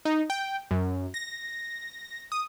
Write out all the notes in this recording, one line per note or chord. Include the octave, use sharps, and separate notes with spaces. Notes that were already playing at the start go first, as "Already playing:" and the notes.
D#4
G5
F#2
A#6
D#6